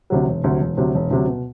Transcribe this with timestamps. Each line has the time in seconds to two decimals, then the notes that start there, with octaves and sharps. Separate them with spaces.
0.10 D2 C3 F#3
0.27 E1
0.44 D2 C3 F#3
0.60 E1
0.77 D2 C3 F#3
0.94 E1
1.11 D2 C3 F#3
1.27 B2